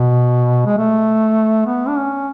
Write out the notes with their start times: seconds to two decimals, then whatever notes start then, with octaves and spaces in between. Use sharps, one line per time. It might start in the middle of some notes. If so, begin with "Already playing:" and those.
Already playing: B2
0.66 G#3
0.78 A3
1.66 B3
1.88 D4
1.97 C#4